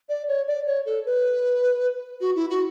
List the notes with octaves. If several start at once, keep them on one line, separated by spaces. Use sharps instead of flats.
D5
C#5
D5
C#5
A4
B4
F#4
E4
F#4